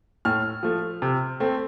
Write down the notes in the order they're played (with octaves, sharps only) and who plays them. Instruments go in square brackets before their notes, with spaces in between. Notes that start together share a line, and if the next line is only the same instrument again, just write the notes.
[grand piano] A2 F6
F3 A3
C3
A3 C4